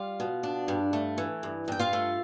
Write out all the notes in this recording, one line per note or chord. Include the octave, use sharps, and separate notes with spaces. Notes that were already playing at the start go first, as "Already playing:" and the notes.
Already playing: G3 F4 F5
B2
D4
G2
A3
E3
G2
G2 G5
F4 F5
A3